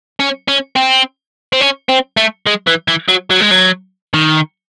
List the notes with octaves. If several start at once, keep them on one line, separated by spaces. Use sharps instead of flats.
C#4
C#4
C4
C4
C#4
C4
A3
G#3
E3
E3
F#3
F#3
G#3
F#3
D#3